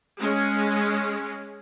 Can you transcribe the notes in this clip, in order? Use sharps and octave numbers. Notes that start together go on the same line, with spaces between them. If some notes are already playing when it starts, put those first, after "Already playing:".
G#3 C#4